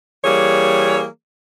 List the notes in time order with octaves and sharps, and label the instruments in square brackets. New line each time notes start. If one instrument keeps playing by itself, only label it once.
[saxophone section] E3 G3 A#3 G#4 C#5